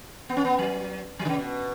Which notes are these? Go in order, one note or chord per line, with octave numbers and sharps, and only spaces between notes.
B3
C#4
B3
F#3
F#3
D3
C#3
B2